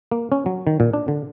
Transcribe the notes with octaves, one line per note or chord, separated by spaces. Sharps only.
A#3
C#4
F#3
D#3
A#2
D4
D3